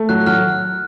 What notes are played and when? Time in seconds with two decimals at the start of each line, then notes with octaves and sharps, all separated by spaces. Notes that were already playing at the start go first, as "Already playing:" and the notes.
Already playing: A3
0.09 F#3 F#6
0.27 F#3 F6